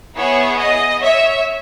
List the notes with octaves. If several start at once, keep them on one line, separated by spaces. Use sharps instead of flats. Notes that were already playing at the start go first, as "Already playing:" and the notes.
B3 E4 G#4 C#5
D#5
C#5 E5